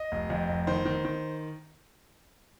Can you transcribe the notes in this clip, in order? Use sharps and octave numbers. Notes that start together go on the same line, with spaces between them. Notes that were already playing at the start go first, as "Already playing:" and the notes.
Already playing: D#5
F1
F2
F1
D#3 C5
D#3
D#3